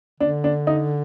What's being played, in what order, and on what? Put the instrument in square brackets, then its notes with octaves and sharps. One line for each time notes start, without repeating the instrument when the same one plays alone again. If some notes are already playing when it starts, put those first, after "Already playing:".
[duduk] D3 [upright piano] D4
[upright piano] D4
D#4